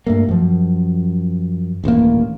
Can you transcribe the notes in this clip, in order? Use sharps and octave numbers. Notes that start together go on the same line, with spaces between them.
G2 A3 A#3
F#2 F3
D#1 A1 G2 A#3